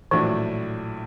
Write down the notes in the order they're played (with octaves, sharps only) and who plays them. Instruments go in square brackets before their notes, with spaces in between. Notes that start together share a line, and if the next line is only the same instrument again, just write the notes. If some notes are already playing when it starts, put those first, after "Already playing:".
[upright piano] A#1 A2 F#3 A3 D4 [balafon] E3